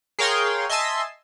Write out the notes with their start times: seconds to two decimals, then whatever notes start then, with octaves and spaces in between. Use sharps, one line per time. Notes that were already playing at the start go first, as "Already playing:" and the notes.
0.19 G#4 A#4 C#5 F5 G5 C6
0.69 D#5 E5 G#5 A5 C6 E6